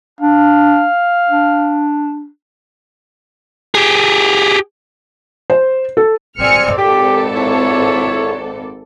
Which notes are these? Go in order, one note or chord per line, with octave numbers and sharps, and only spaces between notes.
D4 F5
D4
G4 G#4
C5
A4
C4 D5 G#5 F6 C#7
G#1 G4 A4 D5
E4 C#5